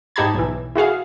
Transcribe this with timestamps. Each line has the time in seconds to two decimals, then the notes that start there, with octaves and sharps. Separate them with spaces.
0.16 G#2 D#4 G4 A5 B5 G#6
0.34 B1 E3
0.75 E4 F#4 G#4 F5